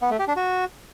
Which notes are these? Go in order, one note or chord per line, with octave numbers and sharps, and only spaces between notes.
B3
A3
G4
D4
F#4